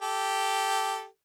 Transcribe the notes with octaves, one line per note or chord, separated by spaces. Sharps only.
G4 A4